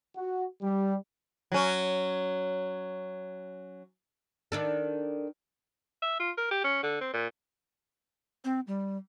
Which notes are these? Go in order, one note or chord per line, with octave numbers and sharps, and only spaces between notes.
F#4
G3
F#3 C#4
D#3 D4 A4
E5
F4
A#4
G4
C#4
D3
C4
A#2
C4
G3